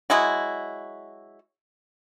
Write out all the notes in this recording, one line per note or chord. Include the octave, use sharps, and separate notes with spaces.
F#3 G#3 E4 F#4